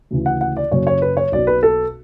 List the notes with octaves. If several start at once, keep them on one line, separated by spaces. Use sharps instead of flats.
D2 C#3 E3
F#5
F#5
D5
F#1 F#2 C#3 C#5
C#5
B4
C#5
B1 B2 D5
B4
A4